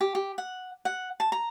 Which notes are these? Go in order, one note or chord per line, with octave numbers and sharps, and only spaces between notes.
G4
G4
F#5
F#5
A5
A#5